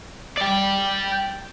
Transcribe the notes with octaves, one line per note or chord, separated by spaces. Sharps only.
D5 G5